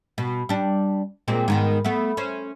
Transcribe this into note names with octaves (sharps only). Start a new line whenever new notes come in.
B2
G3 D4
A#2 G#3 C4
G#2 D#3 B3
A3 B3
C#4 C5